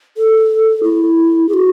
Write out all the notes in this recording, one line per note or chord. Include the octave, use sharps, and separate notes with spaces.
A4
E4
G#4
F#4